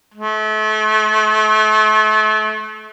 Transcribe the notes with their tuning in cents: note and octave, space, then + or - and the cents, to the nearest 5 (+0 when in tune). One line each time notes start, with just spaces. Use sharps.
A3 -35